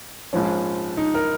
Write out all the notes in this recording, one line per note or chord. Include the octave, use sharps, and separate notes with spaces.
A#1 G#2 F3 C#4
D#4
A#4